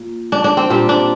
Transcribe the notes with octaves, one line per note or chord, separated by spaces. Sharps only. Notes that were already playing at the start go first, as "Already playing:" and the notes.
Already playing: A#2
D4
D4
C4
A#2 G3 C4
D4